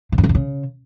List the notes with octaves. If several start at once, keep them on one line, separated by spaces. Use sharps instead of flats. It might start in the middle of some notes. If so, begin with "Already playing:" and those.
C3
G2
D#3
G2
C#3